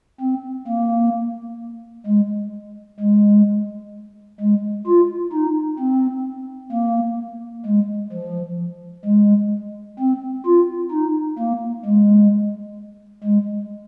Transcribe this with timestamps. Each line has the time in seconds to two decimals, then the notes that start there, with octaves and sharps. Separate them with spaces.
0.20 C4
0.68 A#3
2.07 G#3
3.00 G#3
4.40 G#3
4.86 F4
5.32 D#4
5.79 C4
6.72 A#3
7.66 G#3
8.13 F3
9.05 G#3
9.99 C4
10.45 F4
10.91 D#4
11.39 A#3
11.85 G#3
13.24 G#3